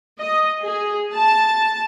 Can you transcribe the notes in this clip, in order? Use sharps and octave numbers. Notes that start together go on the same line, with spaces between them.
D#5
G#4
A5